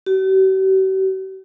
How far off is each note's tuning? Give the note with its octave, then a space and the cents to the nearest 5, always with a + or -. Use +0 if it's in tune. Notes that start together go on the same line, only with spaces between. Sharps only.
G4 -45